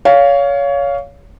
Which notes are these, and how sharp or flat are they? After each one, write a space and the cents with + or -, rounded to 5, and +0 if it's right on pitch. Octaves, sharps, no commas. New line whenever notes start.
C#5 +25 F5 +0